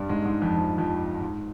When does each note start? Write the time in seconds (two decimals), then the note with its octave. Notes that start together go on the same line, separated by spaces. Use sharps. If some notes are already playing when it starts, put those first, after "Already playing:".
Already playing: G2 G3
0.09 G#2 G#3
0.25 G#2 G#3
0.41 F2 F3
0.57 F2 F3
0.78 F2 F3
1.21 G#2